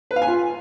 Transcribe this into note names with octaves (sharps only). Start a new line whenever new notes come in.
B4
F5
G#5
F4